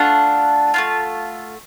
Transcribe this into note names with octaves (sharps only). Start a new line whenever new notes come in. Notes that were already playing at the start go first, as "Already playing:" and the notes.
Already playing: A3 D4 F4 F#5
A3 D4 F4